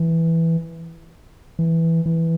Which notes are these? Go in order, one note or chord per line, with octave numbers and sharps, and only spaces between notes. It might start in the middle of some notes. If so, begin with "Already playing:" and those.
Already playing: E3
E3
E3